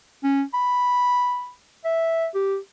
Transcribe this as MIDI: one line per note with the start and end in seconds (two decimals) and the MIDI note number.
0.24 0.43 61
0.54 1.51 83
1.85 2.28 76
2.35 2.57 67